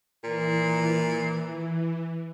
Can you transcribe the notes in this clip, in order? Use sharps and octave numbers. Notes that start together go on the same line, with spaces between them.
A#2 E3